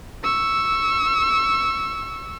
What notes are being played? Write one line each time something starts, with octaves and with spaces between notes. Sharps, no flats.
C#6 E6